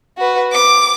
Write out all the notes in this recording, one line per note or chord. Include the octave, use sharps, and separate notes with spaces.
F#4 B4
D6